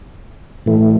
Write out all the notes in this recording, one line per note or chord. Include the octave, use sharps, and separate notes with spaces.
A2 E3 A3